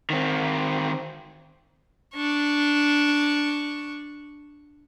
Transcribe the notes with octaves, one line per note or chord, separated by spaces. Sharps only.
D#3 C4
D4 C#6